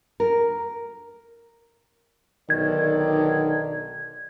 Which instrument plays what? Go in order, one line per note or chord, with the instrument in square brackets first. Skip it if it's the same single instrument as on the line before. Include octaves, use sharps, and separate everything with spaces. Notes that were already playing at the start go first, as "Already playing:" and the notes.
[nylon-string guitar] A#4
[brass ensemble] B1 D3 D5 [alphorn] D#3 [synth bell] G#6